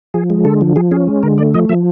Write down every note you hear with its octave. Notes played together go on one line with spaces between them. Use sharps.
F3 G#4
G#3
D3 A4
F3
F3 G#4
C#4 G#4
G#3
D3 A#4
A3 D5
F3 D#5
F3 E5